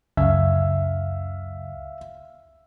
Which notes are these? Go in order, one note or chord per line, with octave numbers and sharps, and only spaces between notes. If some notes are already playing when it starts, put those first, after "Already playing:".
C#2 F#2 C#3 E5 F5